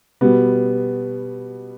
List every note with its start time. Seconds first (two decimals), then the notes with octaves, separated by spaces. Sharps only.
0.21 B2 G3 B3